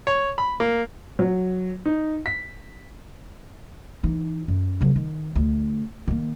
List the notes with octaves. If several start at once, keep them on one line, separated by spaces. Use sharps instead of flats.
C#5
B5
A#3
F#3
D#4
B6
E3 D#4
F#2
C#3 F#3
D#3
D2
D#3 A#3